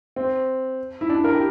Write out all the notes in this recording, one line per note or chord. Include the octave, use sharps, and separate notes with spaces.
C4
E4
D4
A#4
G4